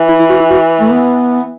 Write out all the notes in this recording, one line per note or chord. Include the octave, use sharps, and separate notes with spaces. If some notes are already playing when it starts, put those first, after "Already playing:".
Already playing: E3
E4
E4
F#4
E4
F#4
A3
B3